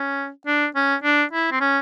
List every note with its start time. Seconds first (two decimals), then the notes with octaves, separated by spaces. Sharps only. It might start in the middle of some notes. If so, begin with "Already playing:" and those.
Already playing: C#4
0.47 D4
0.76 C#4
1.03 D4
1.33 E4
1.52 C4
1.60 C#4